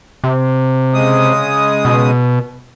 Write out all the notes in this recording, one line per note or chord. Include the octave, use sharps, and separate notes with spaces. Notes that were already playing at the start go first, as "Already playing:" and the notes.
C3
C#3 G#3 D#6
B2